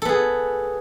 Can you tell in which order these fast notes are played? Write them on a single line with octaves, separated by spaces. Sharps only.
A4 B3 G#4